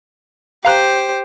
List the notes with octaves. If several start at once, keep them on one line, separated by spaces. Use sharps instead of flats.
G4 C5 F5 A#5 F#6